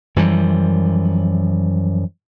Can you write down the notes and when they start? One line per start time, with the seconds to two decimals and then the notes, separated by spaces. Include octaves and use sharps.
0.16 F#2 E3 F3 G3